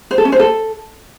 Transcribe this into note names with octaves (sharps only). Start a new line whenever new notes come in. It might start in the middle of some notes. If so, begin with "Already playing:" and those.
C5
A4
C#4
C5
A4